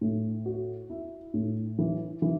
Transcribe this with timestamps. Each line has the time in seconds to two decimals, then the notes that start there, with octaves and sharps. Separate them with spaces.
0.01 A2
0.46 F#4
0.90 E4
1.34 A2
1.79 E3
2.22 E3